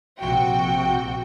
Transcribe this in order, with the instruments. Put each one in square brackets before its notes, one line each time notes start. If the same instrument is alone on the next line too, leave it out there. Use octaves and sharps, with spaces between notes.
[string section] A#1 C3 F#4 G5